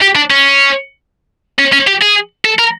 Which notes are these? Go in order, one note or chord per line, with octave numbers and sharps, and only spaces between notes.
G4
D4
C#4
C#4
C#4
G4
G#4
A4
A#4